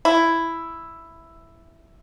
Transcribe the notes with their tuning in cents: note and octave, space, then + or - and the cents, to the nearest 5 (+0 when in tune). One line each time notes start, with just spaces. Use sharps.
E4 +5